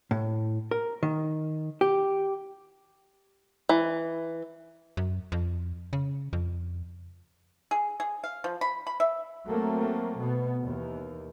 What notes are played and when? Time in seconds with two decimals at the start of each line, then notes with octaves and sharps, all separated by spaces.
0.11 A2
0.71 A#4
1.03 D#3
1.81 G4
3.69 E3
4.97 F#2
5.32 F2
5.93 C#3
6.33 F2
7.71 G#4
8.00 G#4
8.24 F5
8.44 F3
8.61 B5
8.87 B5
9.00 E5
9.48 F#3 A3 A#3 C4
10.20 B2 B3
10.63 D#2 E3